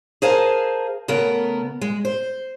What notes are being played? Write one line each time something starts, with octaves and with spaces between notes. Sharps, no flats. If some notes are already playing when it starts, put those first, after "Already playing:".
G#4 A#4 C5 F5 G#5 A5
C#3 A3 B3 A#4
G#3
C5